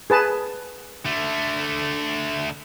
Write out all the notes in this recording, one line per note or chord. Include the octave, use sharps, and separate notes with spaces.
G#4 B4 A5
D3 A3